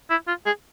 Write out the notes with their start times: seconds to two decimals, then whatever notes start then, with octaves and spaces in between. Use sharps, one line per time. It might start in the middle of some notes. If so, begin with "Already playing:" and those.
0.10 E4
0.28 F4
0.46 G#4